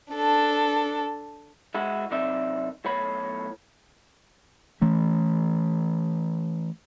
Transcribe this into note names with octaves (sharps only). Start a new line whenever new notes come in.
D4 A4
G#3 E4 F#4
F#2 C3 C4 D#4 D5 E5
B1 A2 C#5 B5
E3 A3 C#4